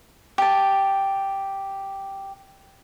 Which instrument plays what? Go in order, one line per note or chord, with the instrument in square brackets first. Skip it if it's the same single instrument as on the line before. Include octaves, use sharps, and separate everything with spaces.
[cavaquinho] G4 A5